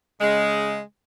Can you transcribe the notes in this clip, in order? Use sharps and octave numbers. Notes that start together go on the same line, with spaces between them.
C#3 G#3